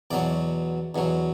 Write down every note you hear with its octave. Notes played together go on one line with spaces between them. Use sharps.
E2 B2 F#3 D5
E2 B2 F#3